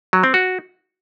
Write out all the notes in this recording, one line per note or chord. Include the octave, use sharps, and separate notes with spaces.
F#3
C4
F#4